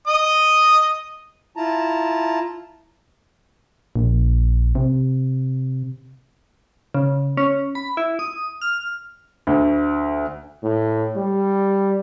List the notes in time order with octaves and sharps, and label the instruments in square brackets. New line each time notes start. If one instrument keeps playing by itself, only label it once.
[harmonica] D#5 D#6
[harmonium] E4 F4 A5 A#5
[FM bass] A#1
C3
[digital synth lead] C#3
C#4
B5
E4
D#6
F6
[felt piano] D2
[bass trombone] A2
G3